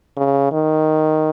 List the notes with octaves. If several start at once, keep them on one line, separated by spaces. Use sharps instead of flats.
C#3
D#3